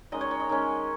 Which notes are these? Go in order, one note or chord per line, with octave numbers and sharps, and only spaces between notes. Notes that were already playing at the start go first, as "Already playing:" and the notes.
D#3 G#3 C#4 D#5
C#5
C#5
D#5
D#3 G#3 C#4